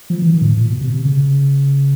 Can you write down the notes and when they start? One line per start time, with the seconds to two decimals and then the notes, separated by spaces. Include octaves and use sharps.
0.10 F3
0.22 E3
0.34 D#3
0.42 A#2
0.45 A2
0.57 A#2
0.70 B2
0.81 C3
0.94 C3
1.05 C#3